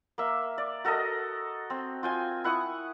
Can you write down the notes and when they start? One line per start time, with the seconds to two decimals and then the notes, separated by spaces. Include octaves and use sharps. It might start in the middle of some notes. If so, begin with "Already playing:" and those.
0.18 A#3 E5
0.58 D5
0.84 F#4 A4 A#4 D#5
1.70 C4
2.03 F4 G5 G#5
2.44 E4 F#5 C#6 D#6